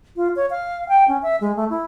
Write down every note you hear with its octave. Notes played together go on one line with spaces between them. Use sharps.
F4
C#5
F5
G5
C#4
E5
G#3
A3
E4